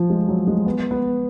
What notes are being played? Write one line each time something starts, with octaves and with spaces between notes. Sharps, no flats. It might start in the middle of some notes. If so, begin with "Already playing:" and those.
Already playing: F3
G#3
F#3
G#3
B3
B3